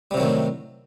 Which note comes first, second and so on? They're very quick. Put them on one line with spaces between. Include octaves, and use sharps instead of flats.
G3 C3 F#3 D#3 A2